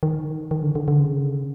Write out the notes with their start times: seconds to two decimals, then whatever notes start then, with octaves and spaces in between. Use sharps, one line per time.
0.03 D#3
0.51 D#3
0.63 D3
0.75 D3
0.88 D3
1.00 C#3